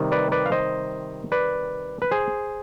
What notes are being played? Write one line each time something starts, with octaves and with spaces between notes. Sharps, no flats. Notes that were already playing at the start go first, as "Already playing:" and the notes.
Already playing: C3 D#3 G3
B4 D5
B4 D5
F5
C5 D#5
B4 D5
B4
G#4 C5